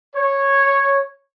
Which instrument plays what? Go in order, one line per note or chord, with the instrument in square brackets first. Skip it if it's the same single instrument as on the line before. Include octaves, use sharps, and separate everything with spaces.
[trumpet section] C#5